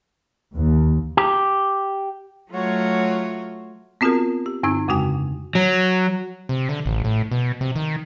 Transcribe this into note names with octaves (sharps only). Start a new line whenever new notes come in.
D#2
G4
F#3 A3 F4 F#4 C#5
B3 C4 F4 F#4 G#4 A#4
G4
G2 D3 C4 D#4 E6 G#6
F2 C#3 G#3 F#4 G5 G#5
F#3
C3
D3
A1
A2
B2
C3
D#3